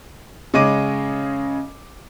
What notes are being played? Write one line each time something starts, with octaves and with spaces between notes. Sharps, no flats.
C#3 G#3 C#5 D#5 D6 D#7